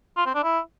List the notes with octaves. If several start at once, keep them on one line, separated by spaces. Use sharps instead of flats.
F4
C4
D4
E4